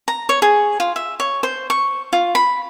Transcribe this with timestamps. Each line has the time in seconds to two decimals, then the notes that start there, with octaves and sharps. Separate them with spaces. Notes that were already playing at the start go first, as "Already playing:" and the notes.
0.08 A#5
0.29 C#5
0.42 G#4
0.80 F4
0.96 E5
1.20 C#5
1.43 C5
1.70 C#6
2.13 F4
2.35 B5